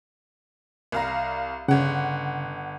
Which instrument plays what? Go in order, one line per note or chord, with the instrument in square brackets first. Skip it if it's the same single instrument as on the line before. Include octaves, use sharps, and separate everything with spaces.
[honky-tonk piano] C2 F5 A#5
[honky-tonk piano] G1 F#5 [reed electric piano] C#3